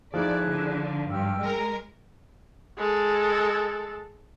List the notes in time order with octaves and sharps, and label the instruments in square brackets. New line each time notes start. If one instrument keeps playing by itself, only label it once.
[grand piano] F3 A3 D#4 [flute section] E4 G#4 F#6 [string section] D5
[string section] D3
[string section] G2 [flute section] G5 E6 F6
[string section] G#3 A#4
[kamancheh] G#3 A4